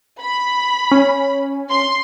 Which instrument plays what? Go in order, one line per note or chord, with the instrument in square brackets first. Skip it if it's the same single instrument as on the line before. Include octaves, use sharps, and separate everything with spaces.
[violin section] B5
[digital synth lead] C#4
[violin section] C6